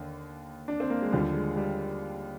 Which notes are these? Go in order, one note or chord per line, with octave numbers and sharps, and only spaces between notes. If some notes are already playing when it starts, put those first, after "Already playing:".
Already playing: D#2 D3
D4
C4
A#3
G#3
D#2 D3 F3 G3
G#3
G3